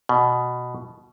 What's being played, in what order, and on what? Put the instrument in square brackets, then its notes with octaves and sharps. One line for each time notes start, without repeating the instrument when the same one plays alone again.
[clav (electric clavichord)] B2